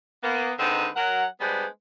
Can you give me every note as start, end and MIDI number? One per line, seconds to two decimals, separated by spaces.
0.22 0.52 58
0.22 0.52 59
0.58 0.87 50
0.58 0.87 51
0.58 0.87 56
0.58 0.87 60
0.58 0.87 63
0.58 0.87 71
0.97 1.24 54
0.97 1.24 70
0.97 1.24 78
1.41 1.65 55
1.41 1.65 56
1.41 1.65 59
1.41 1.65 62
1.41 1.65 71
1.41 1.65 72